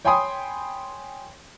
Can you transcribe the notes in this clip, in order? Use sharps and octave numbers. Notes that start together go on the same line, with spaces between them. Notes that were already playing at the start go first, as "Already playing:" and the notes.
C#5 G5 G#5 B5 C6 D#6